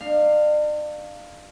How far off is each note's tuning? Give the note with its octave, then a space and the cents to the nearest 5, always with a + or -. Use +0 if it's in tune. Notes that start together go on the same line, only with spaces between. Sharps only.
D4 +40 F5 +0